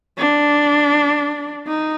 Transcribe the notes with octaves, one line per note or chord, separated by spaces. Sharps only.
D4
D#4